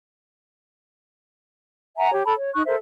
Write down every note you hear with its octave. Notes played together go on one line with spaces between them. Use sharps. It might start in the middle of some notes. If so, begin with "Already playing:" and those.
E5 F#5 G#5 A#5
G4 C#5
A4 A5 B5
C#5
D#4 C#6 F#6
A4 A#4 C5 E5